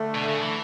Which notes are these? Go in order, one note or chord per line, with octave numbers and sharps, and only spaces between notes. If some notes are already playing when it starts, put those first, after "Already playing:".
Already playing: D3 A3 D4
B2
C#3
E3